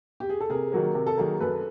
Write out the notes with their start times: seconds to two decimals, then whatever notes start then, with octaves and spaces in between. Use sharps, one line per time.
0.20 G4
0.30 G#4
0.41 A4
0.50 C3 G#4 A#4
0.72 D#3 F#3 A#3
0.95 C3 A#4
1.07 A4
1.17 D#3 F#3 A#3 G#4 A#4
1.40 F#2 A4 B4